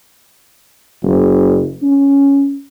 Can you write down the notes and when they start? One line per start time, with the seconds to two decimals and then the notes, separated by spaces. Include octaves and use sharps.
1.03 F#1
1.83 C#4